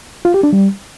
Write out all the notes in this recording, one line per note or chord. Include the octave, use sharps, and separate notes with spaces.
F4
G4
D4
G3